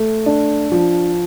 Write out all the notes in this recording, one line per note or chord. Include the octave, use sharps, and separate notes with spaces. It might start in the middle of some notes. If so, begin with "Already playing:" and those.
Already playing: A3
D4
F3